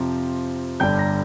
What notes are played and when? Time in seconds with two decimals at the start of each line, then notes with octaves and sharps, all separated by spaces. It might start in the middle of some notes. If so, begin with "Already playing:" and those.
Already playing: F2 C3 F3 C4 A#5
0.80 G1 G2 D3 G3 D4 G5 G6
0.99 A#5 A#6